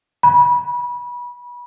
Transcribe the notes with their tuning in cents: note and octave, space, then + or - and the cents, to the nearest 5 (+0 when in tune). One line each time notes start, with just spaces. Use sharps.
B5 -25